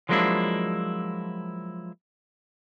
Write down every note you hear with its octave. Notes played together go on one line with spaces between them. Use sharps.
F3 F#3 G#3 A#3 D4 E4